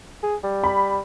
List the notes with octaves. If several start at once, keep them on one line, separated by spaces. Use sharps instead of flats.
G#4
G3
B5